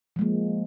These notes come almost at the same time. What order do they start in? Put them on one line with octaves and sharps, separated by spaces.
F3 G#3 A#3